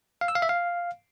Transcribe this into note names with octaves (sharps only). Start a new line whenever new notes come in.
F5
E6
F5
E5
F5